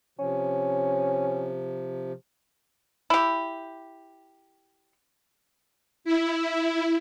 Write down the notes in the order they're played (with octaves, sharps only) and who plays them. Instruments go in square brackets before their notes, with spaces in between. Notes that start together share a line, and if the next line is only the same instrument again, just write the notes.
[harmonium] C3 F3 [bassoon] C#4
[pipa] E4 G4
[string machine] E4